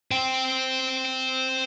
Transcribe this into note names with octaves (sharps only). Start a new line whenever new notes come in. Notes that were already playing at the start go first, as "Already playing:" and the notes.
C5 G5